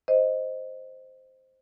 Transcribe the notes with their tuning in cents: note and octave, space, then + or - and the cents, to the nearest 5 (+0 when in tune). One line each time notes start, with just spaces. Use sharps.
C5 +0 D#5 +0